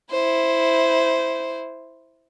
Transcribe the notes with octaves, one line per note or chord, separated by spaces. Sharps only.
E4 C5